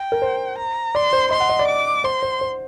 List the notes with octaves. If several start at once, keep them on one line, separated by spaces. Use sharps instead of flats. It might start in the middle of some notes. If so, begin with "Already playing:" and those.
Already playing: G5
A#4
C5
A#5
D5 C6
C5
D#5 C6
F#5
D#5
D5
D6
C5 C6
C5
C5